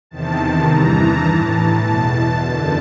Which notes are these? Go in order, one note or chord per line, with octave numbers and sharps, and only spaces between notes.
E2 C3 D#3 A5
A5
G2 E3 A#5
A5
A2 E3
A5
E2 B2 A5
F#2 D3